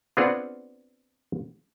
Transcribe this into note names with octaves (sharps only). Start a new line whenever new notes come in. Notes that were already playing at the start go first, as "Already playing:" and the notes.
B3 C4 D4 F4 G#4 F#5